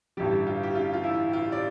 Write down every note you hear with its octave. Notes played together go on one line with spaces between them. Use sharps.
A1 G2 D3 G3 G4
F4
G4
F4
F4
E4
F4
D5